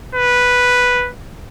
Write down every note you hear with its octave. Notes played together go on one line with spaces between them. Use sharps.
B4